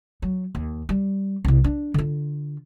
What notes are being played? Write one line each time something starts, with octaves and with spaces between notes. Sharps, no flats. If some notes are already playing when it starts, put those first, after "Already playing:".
F#3
D#2
G3
C2 C3
D4
D3 F4